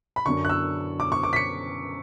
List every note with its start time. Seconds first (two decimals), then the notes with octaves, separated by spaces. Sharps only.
0.16 B5
0.26 F#2 D3 C#6
0.45 F#6
0.49 E6
1.00 D6
1.12 C#6
1.23 D6
1.33 B6
1.36 C#7